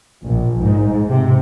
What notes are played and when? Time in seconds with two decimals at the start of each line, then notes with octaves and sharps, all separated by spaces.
0.25 A#1
0.62 G#2
1.09 C3